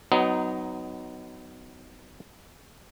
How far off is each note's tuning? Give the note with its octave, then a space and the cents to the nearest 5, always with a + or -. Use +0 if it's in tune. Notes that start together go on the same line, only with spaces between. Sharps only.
F#3 +10 B3 +35 D#4 +0